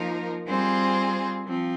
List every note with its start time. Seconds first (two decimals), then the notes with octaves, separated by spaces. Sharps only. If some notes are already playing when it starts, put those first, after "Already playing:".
Already playing: F3 A#3 D#4 A#4
0.46 G3 C4 F4 G#4 C5
1.46 F3 C4